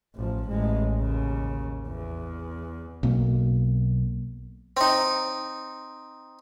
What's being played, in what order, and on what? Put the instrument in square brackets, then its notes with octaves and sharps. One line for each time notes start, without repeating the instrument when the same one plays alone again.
[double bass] A1 F3
A1 G#3
D#2 C#3
E2
[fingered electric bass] B1 B2 A#3
[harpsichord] C4 D#4